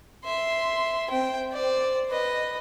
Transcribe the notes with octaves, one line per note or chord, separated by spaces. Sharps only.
E5 C6
C4 G5
C5 D5
B4 D#5